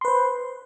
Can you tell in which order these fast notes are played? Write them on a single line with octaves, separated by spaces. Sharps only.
C6 B4 C5